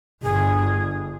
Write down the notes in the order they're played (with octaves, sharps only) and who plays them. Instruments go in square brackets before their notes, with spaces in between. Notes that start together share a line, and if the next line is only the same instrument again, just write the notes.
[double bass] G1 G2 [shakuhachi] G#4